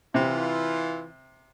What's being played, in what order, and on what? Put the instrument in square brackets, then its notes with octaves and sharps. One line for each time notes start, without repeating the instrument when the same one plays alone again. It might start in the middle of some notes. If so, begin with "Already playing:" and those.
[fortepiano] C3 [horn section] E3 F4